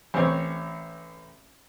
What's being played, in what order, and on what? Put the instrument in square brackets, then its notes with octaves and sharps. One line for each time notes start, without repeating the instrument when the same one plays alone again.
[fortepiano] A1 C4 C#5